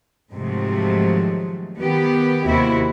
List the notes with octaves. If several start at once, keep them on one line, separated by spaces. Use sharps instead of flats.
G#2 C3 D#3 F3 F#3 A3
D#3 B3 G4
D#2 C3 E4 F#4